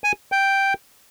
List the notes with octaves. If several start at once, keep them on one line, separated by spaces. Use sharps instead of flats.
G#5
G5